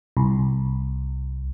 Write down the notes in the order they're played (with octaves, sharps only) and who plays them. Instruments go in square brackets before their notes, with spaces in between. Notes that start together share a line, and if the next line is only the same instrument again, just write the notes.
[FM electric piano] C2